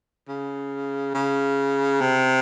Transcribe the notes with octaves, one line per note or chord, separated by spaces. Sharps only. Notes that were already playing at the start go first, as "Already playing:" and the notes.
C#3
C#3
C3